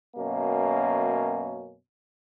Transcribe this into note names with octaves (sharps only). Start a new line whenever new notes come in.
F#2 B2 A#3 C#4